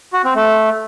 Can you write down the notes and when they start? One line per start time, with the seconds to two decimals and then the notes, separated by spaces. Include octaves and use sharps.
0.13 F#4
0.24 C4
0.35 A3